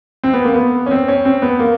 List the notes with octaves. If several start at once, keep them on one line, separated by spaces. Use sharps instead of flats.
C4
B3
A#3
B3
C#4
C4
C#4
C4
B3
A#3